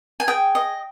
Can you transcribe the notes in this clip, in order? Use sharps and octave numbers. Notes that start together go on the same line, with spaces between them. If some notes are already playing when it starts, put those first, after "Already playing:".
G#5
G#4 G5
D#5